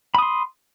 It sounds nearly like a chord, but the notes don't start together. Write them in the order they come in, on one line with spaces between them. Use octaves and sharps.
B5 D#6 C6